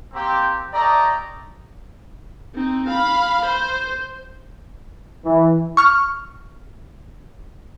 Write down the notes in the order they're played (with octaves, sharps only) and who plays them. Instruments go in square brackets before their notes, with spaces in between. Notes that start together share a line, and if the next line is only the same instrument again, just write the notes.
[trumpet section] A#3 C4 G4
A3 G4 A4 D5 D#5 A#5
[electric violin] C4 D#4
F5 B5
C5
[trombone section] E3
[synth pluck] C#6 F6